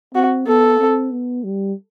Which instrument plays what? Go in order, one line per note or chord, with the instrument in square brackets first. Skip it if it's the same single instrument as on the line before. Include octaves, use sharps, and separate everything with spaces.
[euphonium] C4 [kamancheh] F#4
[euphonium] B3 [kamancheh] A4
[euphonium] C4
B3
G3